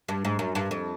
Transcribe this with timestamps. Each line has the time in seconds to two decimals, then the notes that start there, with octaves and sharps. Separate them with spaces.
0.08 G2
0.25 G#2
0.39 F#2
0.55 G2
0.71 F2